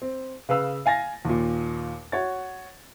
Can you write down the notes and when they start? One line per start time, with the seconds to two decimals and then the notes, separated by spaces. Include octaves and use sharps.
0.02 C4
0.49 C#3 B4 F5 E6
0.86 F5 G#5 A6 A#6
1.25 D#2 A#2
2.12 F#4 C#5 A6